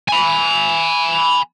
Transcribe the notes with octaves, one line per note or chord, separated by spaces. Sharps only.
G#5 B5